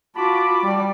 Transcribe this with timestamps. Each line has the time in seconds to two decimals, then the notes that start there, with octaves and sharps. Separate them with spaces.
0.16 F4 F#4 A5 B5 D6
0.63 G3 D5